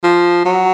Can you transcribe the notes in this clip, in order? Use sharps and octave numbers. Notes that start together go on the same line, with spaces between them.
F3
F#3